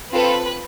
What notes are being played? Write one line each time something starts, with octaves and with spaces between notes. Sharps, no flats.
C4 F4 A4 B4